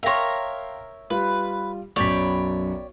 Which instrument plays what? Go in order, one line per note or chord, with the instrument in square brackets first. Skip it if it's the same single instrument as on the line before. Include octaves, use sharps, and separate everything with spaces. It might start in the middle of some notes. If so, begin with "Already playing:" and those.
[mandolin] A#4 A#5 [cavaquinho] C#5 E5 [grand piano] F5 G5 C6
[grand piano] G3 F4 [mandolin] B4
[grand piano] B1 F#2 [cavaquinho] C#5 [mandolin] D5 G5 B5